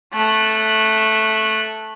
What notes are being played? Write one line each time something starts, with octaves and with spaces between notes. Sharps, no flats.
A3 F#6